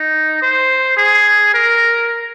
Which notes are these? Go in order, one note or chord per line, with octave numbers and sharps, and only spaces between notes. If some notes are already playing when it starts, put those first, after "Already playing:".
Already playing: D#4
C5
G#4
A#4